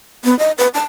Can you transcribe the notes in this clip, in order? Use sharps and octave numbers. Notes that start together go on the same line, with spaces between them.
B3
D#5
B4
A5